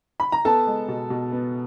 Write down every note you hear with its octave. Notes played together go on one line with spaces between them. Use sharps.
B5
A#5
B3 A4 A5
G#3
B2
B2
B3